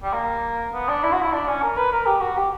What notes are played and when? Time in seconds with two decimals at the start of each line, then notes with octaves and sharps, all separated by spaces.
0.03 G3
0.14 A#3
0.73 B3
0.88 D4
1.03 E4
1.13 F#4
1.22 E4
1.32 D4
1.48 C#4
1.63 A#4
1.77 B4
1.92 A#4
2.07 G4
2.21 F#4
2.37 G4